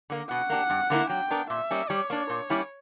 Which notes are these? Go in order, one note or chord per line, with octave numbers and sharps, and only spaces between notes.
D3 A#3
B2 F#5
A#3 D4 G4
G2
D3 A#3 C#4 E4
F#3 G5
B3 D4 A#4
A#2 E5
G3 A#3 C#4
G3 C#5
A#3 D4
A#2
G3 A#3 C#4 E4